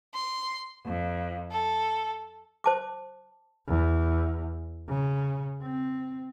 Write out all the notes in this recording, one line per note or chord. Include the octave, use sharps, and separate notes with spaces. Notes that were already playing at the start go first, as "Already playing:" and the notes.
C6
F2
A4
C5 A5 D6
E2
C#3
C4